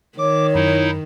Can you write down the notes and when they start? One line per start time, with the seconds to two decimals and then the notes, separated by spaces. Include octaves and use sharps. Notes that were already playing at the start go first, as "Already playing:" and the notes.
0.18 D#3 C#5 D6
0.55 F#2 D#4 E4